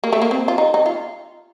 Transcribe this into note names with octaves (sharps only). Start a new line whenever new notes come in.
A#3
A3
A#3
C4
F4
D#4
D#4
F4